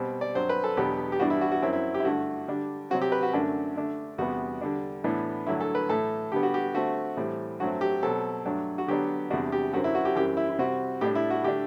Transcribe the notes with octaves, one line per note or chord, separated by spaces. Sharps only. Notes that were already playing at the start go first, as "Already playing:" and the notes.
Already playing: B2 G3 C4
D5
G2 F#3 C4 C5
B4
A4
E2 B2 F#3 B3 D4 G4
G4
G2 E3 G3 B3 D4 F#4
E4
F#4
F#4
F#2 F#3 C4 E4
E4
G4
E4
G2 D3 A3 F#4
D3 G3 D4
C3 F#3 C4 F#4
G4
B4
F#4
F#2 D3 A3 D4
D3 A3 D4
E2 C3 G3 B3 F#4
D3 G3 D4
A2 E3 B3 D4
G2 D3 F#3 A3 E4
A4
B4
A2 E3 A3 A4
D3 G3 B3 G4
F#4
G4
D3 A3 C4 F#4
A2 E3 G3 C4
G2 F#3 A3 C4 F#4
G4
B2 F#3 C4 A4
G2 F#3 A3 D4
F#4
D3 F#3 B3 D4 G4
E2 C3 G3 D4 F#4
G4
F#2 D3 F#3 C4 F#4
E4
F#4
G4
F#2 E3 G3 C4 G4
E4
E4
C3 G3 C4 F#4
A2 G3 D4 G4
E4
F#4
D3 A3 D4 G4